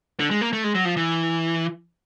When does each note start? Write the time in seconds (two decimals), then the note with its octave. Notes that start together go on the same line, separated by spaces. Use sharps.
0.20 D3
0.31 G#3
0.41 A#3
0.53 A3
0.64 G#3
0.75 F#3
0.85 F3
0.97 E3